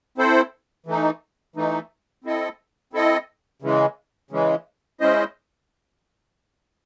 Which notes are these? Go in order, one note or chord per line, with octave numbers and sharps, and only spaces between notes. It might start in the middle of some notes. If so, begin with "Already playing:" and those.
C4 E4 A4 C5
E3 A3 D#4
E3 A3 D#4
C4 E4 A4 D#5
C4 E4 A4 D#5
C#3 E3 G#3
C#3 E3 G#3
G#3 C#4 E4 C5 D#5